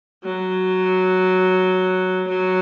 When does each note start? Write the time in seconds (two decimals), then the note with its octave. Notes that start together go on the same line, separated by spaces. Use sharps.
0.24 F#3
2.28 F#3